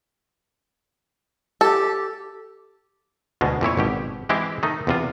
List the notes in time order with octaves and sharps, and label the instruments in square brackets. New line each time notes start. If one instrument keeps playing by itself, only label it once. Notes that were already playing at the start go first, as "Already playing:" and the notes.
[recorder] G4 [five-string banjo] A4
[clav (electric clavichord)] D2 B2 G#3
F2 A#2 E4 C#5
G#1 B2 G4
E3 G#3 C4 E4 G4
D#3 A3 D#4
E2 C3 F4